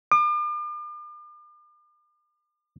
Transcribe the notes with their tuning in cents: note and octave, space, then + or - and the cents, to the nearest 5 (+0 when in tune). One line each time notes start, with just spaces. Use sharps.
D6 +40